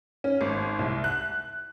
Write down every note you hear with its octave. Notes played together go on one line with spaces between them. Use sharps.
C#4
G#1
C2
F#6